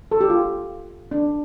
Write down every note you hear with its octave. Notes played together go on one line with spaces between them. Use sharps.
A4
G4
F4
D4